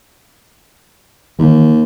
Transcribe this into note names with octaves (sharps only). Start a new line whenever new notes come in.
D#2 D#3 E3